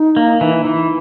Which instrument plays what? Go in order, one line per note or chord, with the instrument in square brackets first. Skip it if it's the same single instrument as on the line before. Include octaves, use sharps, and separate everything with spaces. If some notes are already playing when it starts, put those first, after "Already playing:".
Already playing: [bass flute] D#4
[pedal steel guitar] A#3
E3
E3